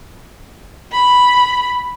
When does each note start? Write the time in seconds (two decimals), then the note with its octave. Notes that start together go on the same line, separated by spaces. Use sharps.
0.92 B5